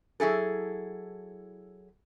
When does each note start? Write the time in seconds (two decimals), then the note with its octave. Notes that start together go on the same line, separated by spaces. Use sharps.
0.20 F#3 E4 G#4 A4